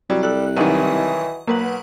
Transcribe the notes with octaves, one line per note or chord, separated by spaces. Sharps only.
C2 F#3 G3
G3 A4 F#6
B1 D#3 E3 D#5 F#5
B1 A#3 B4 F#5